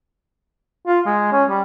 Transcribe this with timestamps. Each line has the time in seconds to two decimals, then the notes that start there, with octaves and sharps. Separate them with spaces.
0.87 F4
1.06 G#3
1.32 C#4
1.49 G3